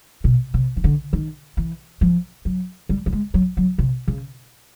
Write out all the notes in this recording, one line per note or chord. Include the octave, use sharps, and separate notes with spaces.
B2
C3
D#3
D3
D#3
E3
F3
F#3
G3
G3
G#3
F#3
F#3
C3
C#3